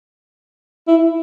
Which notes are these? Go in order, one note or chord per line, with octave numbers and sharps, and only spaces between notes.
E4